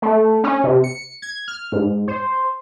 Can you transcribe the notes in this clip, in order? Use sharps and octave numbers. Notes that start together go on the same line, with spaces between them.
A3
C#4
C3
C#7
G#6
F6
G#2
C5